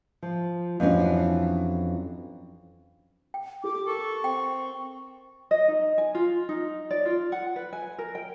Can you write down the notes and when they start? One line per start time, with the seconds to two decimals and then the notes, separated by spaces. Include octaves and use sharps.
0.22 F3
0.80 F2 E3 F#3 C#4 D4
3.34 G5
3.64 G4 A4 D6
3.87 A4 A#4 C#6
4.24 C4 G5
5.51 D#5
5.68 D#4
5.98 G#5
6.15 F4
6.49 D#4
6.91 D5
7.06 F4
7.32 F#5
7.56 B4
7.73 G#5
7.98 A#4
8.15 G5